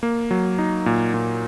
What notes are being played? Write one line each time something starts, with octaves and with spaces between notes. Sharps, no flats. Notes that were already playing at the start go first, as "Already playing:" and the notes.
A#3
F#3
D#4
A#2
A#2